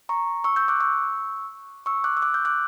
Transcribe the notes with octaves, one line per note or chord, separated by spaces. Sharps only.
A#5 C#6
C#6 E6
E6 G6
D6 F#6
C#6 E6
C#6 E6
D6 F#6
E6
D6 F#6
E6 G6
D6 F#6